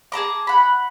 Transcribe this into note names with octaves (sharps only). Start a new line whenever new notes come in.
G#4 A5 A#5 D6
F#5 B5